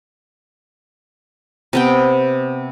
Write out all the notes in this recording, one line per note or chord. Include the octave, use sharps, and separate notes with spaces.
C3 B3 G5